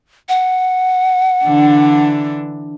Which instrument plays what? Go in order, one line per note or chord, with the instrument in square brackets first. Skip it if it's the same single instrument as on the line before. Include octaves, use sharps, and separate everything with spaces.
[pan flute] F#5
[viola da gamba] D3 E3 D4